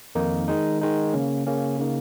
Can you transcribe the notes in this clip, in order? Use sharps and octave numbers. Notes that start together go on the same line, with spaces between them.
F2 D#3 A#3 D#4
D#3 G#3 D#4
D#3 G#3 D#4
C#3 A#3 C#4
C#3 A#3 C#4
C#3 A#3 D#4